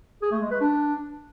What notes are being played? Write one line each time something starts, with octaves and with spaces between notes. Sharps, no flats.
G#4
A3
G#3
B4
D4